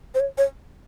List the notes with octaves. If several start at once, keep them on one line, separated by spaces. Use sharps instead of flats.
C5
C#5
C#5